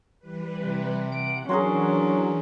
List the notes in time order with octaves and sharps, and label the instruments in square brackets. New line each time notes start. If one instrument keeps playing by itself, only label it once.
[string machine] E3 G3 B4
[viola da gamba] C3
[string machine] F#5 [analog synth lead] D7
[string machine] E3 [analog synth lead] F#3 [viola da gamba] C#4 D4 [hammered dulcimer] G#4 A#4 C6